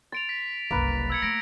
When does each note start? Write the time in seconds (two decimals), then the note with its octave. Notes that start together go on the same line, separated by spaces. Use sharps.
0.12 C6 A6 D7 F7
0.29 B6
0.71 F#1 C2 A#3 B4
1.10 E6 G#6 C#7
1.22 A3 A#6 B6 D7